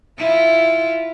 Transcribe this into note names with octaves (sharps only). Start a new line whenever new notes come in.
E4 F4